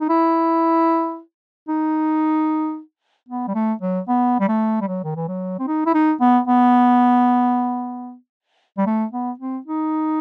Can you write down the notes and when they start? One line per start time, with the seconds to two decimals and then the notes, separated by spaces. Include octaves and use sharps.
0.01 D#4
0.09 E4
1.68 D#4
3.28 B3
3.48 G3
3.55 A3
3.81 F#3
4.08 B3
4.40 G3
4.48 A3
4.81 G3
4.88 F#3
5.04 D#3
5.16 E3
5.28 F#3
5.59 C4
5.67 D#4
5.86 E4
5.94 D#4
6.21 B3
6.48 B3
8.78 G3
8.86 A3
9.13 B3
9.39 C4
9.66 D#4